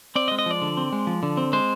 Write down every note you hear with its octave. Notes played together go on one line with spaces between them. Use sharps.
C4 D5
D#5
G#3
D#5
F3 D5
D3
C4
G#3
F3
D3
C4
G#3 C5